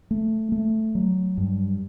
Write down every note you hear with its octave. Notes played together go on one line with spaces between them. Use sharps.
A3
A3
F#3
G2